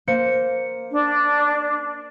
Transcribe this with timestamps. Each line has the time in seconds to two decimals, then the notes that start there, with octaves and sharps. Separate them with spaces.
0.07 A#3 C5 C#7
0.92 D4